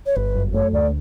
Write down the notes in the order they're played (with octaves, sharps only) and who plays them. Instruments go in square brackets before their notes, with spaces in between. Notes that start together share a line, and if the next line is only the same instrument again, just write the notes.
[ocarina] C#5
[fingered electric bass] G1 [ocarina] B4
[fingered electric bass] F#2
[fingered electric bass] A3 [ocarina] C#5
[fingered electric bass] D2 [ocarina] D5